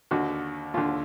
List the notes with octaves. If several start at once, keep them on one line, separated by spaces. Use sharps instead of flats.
D#2 D3 F#4
D#2 D3 F4